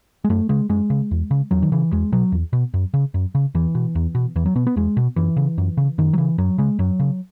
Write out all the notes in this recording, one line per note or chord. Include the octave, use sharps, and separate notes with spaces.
G#3
F#2 A3
C#3 G#3
F#2 G#3
C#3
E2
C#3
E2 F#3
D#3
C#3 E3
E2 G#3
B2 F#3
E2
B2
F#2
C#3
F#2
C#3
E2 E3
B2
E2
B2
E2 E3
F#3
B2 B3
B3
E2 G#3
B2
F#2 E3
C#3
F#2
C#3
F#2 D#3
F#3
C#3 E3
F#2 F#3
C#3 G#3
F#2 F#3
C#3